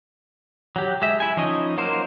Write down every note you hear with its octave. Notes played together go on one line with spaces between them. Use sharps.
F#3 G4
G#3 E5
E4 G#5
F3 C#4 D#4 D#5
F#3 A#3 A#4 C5